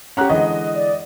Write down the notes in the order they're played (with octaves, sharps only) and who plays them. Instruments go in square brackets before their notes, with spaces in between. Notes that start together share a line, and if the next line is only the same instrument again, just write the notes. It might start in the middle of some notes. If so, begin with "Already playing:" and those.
[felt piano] C#4 A#5 F#6 [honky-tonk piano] G4 F#5
[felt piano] D3 E3 G#3 [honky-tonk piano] D#5
[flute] D5